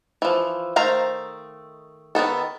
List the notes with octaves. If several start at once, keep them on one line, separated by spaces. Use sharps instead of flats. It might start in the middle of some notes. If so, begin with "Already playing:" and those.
E3 F3
D#3 A3 C5 F5 A#5
D#3 G#3 B3 A4